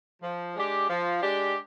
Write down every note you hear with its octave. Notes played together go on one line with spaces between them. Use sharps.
F3
G#3 D4 G4
F3
G#3 D4 G4